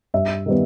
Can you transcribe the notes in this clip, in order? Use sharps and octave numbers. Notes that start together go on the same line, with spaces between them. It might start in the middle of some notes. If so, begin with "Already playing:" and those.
G2 E5
D#3 G3 B3